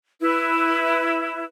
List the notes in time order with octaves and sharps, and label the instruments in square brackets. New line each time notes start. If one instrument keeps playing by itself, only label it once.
[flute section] E4 B4